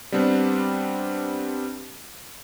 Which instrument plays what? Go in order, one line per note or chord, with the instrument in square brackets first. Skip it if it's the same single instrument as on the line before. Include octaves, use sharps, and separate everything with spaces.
[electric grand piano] G3 B3 C4 D4